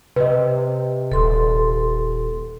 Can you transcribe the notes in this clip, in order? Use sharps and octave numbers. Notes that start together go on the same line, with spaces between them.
C3 B4 D#5
D#1 A4 C6